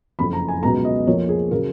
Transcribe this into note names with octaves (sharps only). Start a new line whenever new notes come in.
F#1 F2 F3 B5
A#5
G#5
C#2 B2 F#3 B3 A#5
D#5
F2 F3 A#3 C#5
G#4
C#3 F#3 A#4